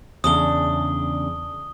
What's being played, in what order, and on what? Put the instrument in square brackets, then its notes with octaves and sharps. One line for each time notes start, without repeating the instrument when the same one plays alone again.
[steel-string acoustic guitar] E2 C#3 D4 [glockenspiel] D#6 G7